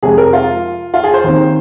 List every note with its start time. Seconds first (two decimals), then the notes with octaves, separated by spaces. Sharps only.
0.03 F2 C3 G#3 G#4
0.18 A#4
0.33 F4
0.94 F4
1.04 G#4
1.14 C5
1.24 D#2 D#3 C4